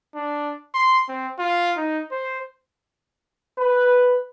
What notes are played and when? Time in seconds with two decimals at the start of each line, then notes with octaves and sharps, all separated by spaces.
0.15 D4
0.74 C6
1.09 C4
1.39 F4
1.77 D#4
2.11 C5
3.59 B4